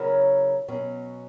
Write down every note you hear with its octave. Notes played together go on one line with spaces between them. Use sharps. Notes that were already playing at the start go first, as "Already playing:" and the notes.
Already playing: C#3 F#3 C#4 E4 A#4
B2 F#3 C#4